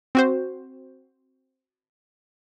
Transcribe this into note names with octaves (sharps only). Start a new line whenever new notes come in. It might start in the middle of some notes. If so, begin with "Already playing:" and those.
C4 F#4 C5